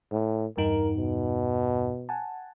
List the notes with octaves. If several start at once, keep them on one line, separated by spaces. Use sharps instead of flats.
A2
E2 G2 D#4 A#4
B2
F#5 G#5 A5